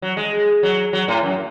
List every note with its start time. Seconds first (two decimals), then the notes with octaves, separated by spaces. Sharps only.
0.02 F#3
0.17 G#3
0.63 F#3
0.93 F#3
1.08 A2
1.23 F#2